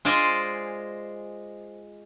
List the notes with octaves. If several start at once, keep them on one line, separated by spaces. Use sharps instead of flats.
G#3 F4 C5 D5 D#5 G#5